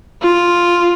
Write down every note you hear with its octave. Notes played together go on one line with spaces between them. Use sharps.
F4